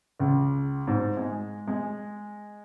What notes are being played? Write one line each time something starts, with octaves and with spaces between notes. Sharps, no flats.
C#2
G#2
G#3
G#3